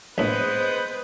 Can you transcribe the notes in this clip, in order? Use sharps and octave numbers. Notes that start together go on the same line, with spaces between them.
A#1 A2 G#3 B3 B4 C5 D#5 G6